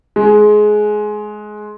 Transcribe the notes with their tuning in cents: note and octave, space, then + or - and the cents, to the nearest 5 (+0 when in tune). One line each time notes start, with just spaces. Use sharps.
G#3 +20